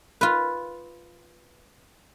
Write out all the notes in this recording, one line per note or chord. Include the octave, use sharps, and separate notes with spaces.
F4 B4